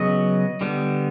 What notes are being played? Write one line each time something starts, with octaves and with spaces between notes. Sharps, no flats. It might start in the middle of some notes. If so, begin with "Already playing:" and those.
Already playing: C#3 F#3 B3 D#5
D3 G3 B3